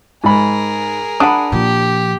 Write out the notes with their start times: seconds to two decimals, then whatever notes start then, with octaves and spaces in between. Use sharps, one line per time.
0.24 G#2 G#4 A#4 B5
1.20 D4 F#5 B5 D#6
1.52 A#2 F3 G4